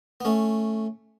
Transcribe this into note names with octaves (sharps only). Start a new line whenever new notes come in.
B3
A3 C#4